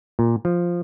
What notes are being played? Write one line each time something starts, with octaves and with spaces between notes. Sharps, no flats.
A#2
F3